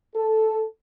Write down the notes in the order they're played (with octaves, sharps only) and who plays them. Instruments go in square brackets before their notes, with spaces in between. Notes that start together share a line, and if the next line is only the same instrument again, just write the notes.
[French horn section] A4